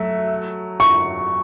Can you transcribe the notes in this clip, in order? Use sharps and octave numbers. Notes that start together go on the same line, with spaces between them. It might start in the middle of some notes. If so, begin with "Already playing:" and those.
Already playing: F#3 A3 E5
C#6